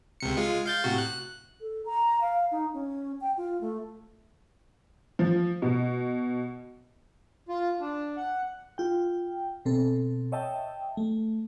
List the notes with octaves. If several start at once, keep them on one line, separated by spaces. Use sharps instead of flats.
C#2 C3 C#7
G#3 F4
F5 G6 A6
A2 C3 F#4
F#6
A4
A#5
F5
D#4
C#4
G5
F4
A3
F3
B2
F4
D4
F#5
F4 G5
B2 C4 A4
C#5 D#5 E5 G5 A5
A3